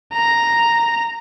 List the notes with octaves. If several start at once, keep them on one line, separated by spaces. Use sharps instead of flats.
A#5